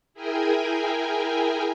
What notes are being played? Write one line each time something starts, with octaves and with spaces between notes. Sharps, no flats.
E4 G#4 A#4 G5 G#5